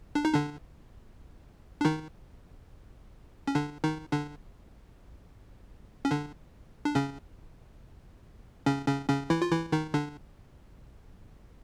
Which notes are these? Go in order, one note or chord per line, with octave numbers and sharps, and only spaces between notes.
D4
D#4
D3 D4
D4
D#3 D#4
C#4
D3 D4
D#3 D#4
D3 D4
C#4
D3 D4
D4
C#3 C#4
C#3 C#4
C#3 C#4
C#3 C#4
E3 E4
F4
E3 E4
D#3 D#4
D3 D4